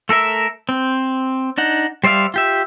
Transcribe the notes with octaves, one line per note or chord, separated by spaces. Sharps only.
A3 A4 A#4 E5
C4
D4 D#4 F#5
G3 C5 D5 E5 F5
F4 G4 E5